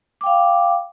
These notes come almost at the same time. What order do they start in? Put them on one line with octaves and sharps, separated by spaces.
D6 G5 F5